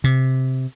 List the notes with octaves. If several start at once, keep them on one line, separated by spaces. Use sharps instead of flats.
C3